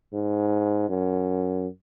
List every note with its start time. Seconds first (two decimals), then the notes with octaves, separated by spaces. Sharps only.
0.13 G#2
0.89 F#2